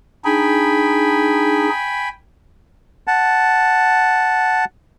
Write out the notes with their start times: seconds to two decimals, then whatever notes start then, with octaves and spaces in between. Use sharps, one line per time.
0.25 D4 D#4 G#4 G5 G#5 B5
3.07 F#5 A5